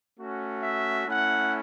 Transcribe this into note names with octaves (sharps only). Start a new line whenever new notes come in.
A3 C#4 F#4
E5
A3 C#4 E4 F#5